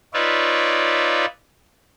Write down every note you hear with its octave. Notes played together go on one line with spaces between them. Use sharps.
D#4 F4 B4 C#5 D5 E5